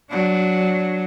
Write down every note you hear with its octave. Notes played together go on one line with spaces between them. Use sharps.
F#3 D4